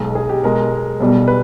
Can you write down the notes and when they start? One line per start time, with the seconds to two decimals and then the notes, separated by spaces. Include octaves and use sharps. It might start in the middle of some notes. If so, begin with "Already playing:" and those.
Already playing: B1 B2 G#3
0.15 G#4
0.29 G4
0.43 B1 B2 G#3 A#4
1.00 B1 B2 G3
1.28 B4